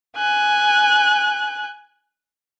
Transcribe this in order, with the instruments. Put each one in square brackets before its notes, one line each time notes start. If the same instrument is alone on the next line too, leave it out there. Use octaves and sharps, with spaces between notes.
[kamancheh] G#5 F#6